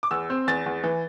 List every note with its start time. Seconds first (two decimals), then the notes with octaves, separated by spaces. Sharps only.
0.03 D6
0.11 E2 E6
0.30 C4
0.47 E2 A6
0.66 E2
0.84 E3